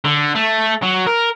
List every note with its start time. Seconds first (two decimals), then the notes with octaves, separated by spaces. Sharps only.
0.05 D3
0.35 A3
0.83 F#3
1.07 A#4